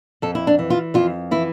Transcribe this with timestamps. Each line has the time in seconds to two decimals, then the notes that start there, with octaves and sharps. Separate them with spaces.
0.22 F2 A4
0.35 E4
0.47 D4
0.59 E3
0.70 F4
0.94 F2 F4
1.31 E3 E4